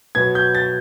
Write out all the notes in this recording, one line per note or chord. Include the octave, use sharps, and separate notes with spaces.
B2 F#3 B3 G#6
G6
A6